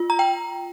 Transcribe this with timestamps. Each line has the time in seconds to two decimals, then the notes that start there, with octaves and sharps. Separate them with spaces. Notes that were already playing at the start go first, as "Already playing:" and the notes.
Already playing: F4
0.10 A#5
0.19 G5